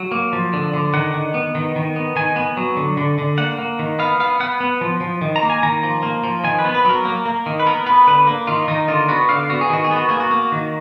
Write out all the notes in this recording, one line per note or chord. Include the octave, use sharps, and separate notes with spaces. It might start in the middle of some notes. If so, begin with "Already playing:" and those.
Already playing: F#3
A#3
F3
D3
D3
D#3 F#5
D#3
B3
D#3
D#3
B3
D#3 G#5
B3
F#3
D3
D3
D3
A#3 F#5
A#3
D#3
B3 F5
B3 F5
B3 F#5
B3
F3
F3
D#3
A#5
A#3
G#5
D#3 A#5
F3
A#3
F3
D#3 G#5
B4
B3
B4
F#3 A#4
A#3
A#3
D#3
B4
B3 A#4
B3 B4
D3 B4
A#3
D#3 F4
D#3 D#4
D3 F4
B3 F#4
D3 F5
B3 F#4
G#4
D#3 F#4
G#4
B3 F#4
A#3 G#4
F#4
A#3
D#3